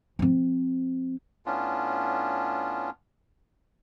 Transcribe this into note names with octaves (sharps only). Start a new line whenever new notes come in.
F3 C4
A2 B3 C#4 D4 F4